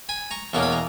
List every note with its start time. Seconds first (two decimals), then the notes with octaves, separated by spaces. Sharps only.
0.09 G#5 B5
0.31 A#5 C#6
0.53 E2 B2 A#3 C#4 C#6
0.63 B5
0.72 A#5